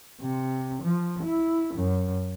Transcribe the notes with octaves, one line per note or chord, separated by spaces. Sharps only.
C3
F3
E4
F#2